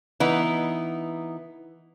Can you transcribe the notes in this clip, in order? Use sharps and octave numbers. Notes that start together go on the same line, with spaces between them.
E3 B3 D#4